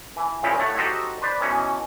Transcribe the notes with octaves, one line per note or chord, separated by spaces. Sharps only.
E3
A#2 C#3 F3 D#4 E4 G4
A2 A3 C#5 F#5
D#4 F#4 G4 A4 C5 D#5
B4 C5 D5
B2 E3 C#4 D#4